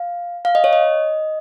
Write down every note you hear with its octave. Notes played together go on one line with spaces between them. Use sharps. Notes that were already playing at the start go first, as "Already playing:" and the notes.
Already playing: F5
F5
D#5
C#5
D#5